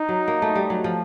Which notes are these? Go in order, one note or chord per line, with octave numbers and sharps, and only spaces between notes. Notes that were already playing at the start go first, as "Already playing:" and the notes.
Already playing: D#4
F#3
A#3
A3
G3
F#3
F3